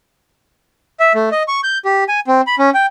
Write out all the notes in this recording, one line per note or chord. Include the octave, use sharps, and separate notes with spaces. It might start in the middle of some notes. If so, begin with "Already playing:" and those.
E5
A3
D#5
C#6
G6
G4
G#5
C4
B5
C#4
G5